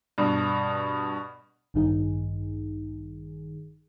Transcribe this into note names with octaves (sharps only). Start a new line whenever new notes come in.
G2 B2
A1 G2 D#3 D#4 G#4